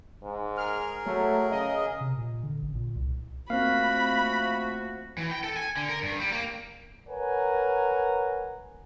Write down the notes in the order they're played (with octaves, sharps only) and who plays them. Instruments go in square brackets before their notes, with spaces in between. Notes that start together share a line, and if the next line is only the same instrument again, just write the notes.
[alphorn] G#2
[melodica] G#4 A#4 [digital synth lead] F6
[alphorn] F#3 [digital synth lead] A3
[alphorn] C#3 [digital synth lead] D#5
[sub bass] C3
A#2
D3
A1
A#2
C2
[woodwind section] F3 A3 F#4 [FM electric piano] A#3 C4 [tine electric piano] F5 [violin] B5
[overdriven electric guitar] E3
G5
A4
G#5
D3
A#4
G2
G3
A#3
[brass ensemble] A#4 B4 C#5 F#5 G#5 A#5